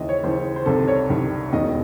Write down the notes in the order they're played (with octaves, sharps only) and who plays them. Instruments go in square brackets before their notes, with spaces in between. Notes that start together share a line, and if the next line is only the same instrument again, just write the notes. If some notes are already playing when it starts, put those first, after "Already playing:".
Already playing: [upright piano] D#2 C#3 E3 D#5 E5
C#5
D#2 C#3 E3 C5
C5
C2 C3 D#3 A4
C#5
C2 C3 D#3
E1 D#2 D#3 D#5